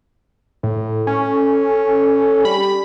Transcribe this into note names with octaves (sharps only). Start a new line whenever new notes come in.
A2
C#4 A4
G3 B5